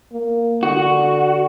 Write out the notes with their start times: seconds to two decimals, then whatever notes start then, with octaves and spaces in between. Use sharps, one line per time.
0.12 A#3
0.63 D3 F#4